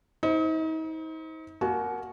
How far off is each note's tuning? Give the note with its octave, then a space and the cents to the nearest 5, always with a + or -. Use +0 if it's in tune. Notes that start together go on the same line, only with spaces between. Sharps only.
D#4 +40 C5 +0
A#3 +0 F#4 +0 G#5 +45